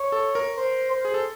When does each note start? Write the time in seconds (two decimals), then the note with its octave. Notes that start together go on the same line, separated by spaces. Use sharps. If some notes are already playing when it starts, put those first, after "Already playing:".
Already playing: C#5
0.12 A4
0.35 A#4
0.58 C5
0.91 C5
1.05 G#4
1.14 A4